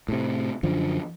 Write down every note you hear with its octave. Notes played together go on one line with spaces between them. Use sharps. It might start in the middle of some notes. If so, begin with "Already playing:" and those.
A2 C3
F#2 D3 F3